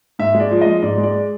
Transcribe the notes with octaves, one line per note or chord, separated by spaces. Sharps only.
G#2 E5
G#3
D5
F3
D#5
G#3
G#2 D5
G#3
D5